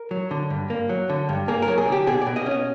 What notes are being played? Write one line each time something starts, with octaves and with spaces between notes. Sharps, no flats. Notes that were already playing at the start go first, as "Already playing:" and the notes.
Already playing: A#4
F#3
D3
G2
A#3
F#3
D3
G2
A#3 G#4
A#4
F#3
G#4
D3 G4
B2 G#4
D5
B2
D#5
C#4 D#5